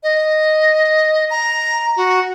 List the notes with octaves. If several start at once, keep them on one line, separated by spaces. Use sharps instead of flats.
D#5
A#5
F#4